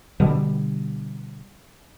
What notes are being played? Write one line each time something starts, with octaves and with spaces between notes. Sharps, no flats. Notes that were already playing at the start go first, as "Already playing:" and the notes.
B2 D3 G3